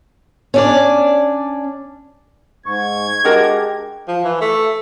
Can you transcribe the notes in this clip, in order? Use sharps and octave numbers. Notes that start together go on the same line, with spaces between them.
C#4 D4 D5
G#2 C#6 G#6
G#3 D4 F#4 G4 A#4
F3
E3
A3